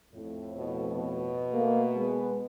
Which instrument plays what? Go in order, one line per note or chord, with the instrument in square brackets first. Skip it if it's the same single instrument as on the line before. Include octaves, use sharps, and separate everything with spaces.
[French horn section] F2 A2
[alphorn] B2
B2
[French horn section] A3 A#3
G#3 B3